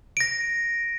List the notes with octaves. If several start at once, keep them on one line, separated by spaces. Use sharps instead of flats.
A#6 D7